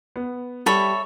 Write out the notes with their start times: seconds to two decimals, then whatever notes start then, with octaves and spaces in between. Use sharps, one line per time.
0.16 B3
0.66 G3 A4 C#5 E5 B5